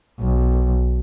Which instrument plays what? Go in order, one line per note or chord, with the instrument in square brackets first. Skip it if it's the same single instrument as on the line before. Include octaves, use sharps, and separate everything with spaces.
[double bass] B1